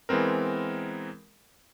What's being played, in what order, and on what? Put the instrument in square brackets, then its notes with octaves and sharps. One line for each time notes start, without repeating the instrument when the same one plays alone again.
[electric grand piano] E3 G#3 B3 C4 A#4